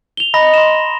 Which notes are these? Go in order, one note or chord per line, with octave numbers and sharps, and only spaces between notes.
F7 G7
D#5 A#5 B5 A#6
C6 E7